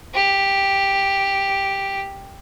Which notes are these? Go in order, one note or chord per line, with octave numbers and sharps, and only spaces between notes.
G4